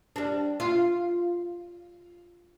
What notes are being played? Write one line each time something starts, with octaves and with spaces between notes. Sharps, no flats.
G3 D4
F4